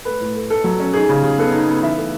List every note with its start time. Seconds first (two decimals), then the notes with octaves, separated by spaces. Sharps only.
0.05 A3 B4
0.21 A2
0.36 A3
0.50 A3 A4
0.64 F#3
0.80 C#4
0.93 D#4 G#4
1.09 C#3
1.23 C#3
1.38 B3 A4
1.53 D#4
1.68 B3
1.83 E3 E5
1.97 A3